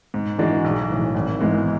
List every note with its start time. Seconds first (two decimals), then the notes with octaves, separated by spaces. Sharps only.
0.14 G#2
0.38 E3 G#3 D4 F#4
0.64 B1
0.89 A2 E3
1.15 G#1
1.40 G#2 E3 G#3 B3